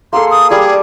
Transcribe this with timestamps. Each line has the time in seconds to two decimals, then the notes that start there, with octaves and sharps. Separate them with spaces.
0.13 A#3 G#4 A4 C6
0.31 D#6
0.50 G3 G#4 A4 D5